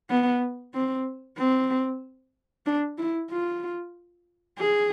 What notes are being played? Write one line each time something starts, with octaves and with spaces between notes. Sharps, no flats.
B3
C4
C4
D4
E4
F4
G#4